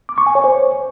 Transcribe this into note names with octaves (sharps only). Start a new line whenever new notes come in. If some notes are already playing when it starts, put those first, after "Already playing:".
D6
C#6
G#5
C#5
C5